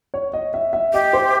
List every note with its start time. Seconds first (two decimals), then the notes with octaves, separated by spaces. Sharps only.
0.14 C#5
0.33 D#5
0.54 E5
0.73 E5
0.93 G4 D#5
1.13 C5